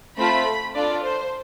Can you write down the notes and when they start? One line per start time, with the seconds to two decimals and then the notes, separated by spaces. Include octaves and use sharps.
0.17 A3 C4 F4 A4 B5
0.75 D4 F4 A4 D5
1.03 C5